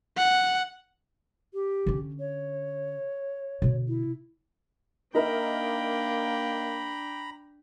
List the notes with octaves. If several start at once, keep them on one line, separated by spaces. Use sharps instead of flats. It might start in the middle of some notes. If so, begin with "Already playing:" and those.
F#5
G4
D3 C#4
C#5
B2 D3
E4
A#3 D4 D#4 A#4 E5 G5 A#5 B5